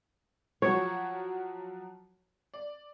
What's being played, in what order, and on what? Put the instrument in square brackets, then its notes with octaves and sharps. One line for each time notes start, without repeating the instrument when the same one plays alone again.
[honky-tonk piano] F3 F#3 F#4 [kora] C#5
[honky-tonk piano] D5